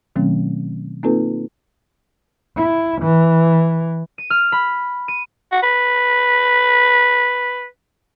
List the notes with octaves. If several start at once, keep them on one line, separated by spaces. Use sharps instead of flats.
B2 D#3 F#3 A3 C4 C#4
A#3 C4 D#4 F4 A4 B4
E4
E3
D#7
F6
B5
D#7
F#4
B4